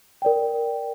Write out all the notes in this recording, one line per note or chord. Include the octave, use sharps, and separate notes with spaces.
A#4 D5 G5